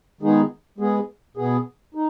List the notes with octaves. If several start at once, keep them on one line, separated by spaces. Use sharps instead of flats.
D#3 G#3 B3 D#4 G#4
G#3 B3 G#4
B2 B3 G#4
D#4